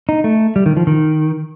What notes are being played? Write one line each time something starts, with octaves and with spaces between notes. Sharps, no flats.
D#4
A3
G3
D#3
F3
D#3